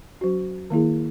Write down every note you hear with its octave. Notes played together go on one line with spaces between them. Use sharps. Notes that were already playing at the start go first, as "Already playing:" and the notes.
F#3 C#4 F#4
D#3 A#3 E4 G#4